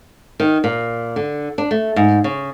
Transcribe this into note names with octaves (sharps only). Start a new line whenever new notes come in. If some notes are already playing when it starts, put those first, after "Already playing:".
D#3
A#2
D3
D4
A3
G#2
C#3